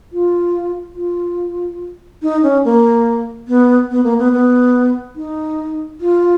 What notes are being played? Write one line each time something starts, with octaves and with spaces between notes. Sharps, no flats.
F4
F4
D#4
C#4
A#3
B3
B3
A#3
B3
B3
D#4
F4